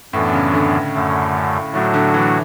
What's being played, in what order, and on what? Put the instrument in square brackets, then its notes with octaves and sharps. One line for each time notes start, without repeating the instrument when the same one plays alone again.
[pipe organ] F#2 E3 B3 D4 [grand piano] A2
[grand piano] C#3
D3
[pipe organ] F#2 D3 A3
[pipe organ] A2 F#3 A3 D4 F#4 [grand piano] D3
[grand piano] D3
E3